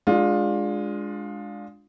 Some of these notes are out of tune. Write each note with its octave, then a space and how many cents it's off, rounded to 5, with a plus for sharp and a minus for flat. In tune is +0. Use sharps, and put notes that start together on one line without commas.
G#3 +0 D4 +0 F4 +20